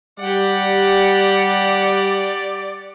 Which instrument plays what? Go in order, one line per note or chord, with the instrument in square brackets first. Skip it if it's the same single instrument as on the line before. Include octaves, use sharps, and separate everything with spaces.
[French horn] G3 [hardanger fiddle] G4 F#5 [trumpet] D5